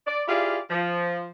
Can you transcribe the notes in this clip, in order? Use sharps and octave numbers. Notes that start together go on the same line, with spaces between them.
D5
E4 F4 G4 G#4 D5 F5
F3